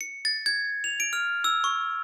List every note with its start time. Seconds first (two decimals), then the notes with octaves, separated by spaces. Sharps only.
0.01 C#7
0.25 A6
0.46 G#6
0.84 F7
1.00 D7
1.13 F6
1.44 E6
1.64 C#6